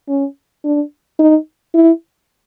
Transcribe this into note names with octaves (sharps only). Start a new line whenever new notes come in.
C#4
D4
D#4
E4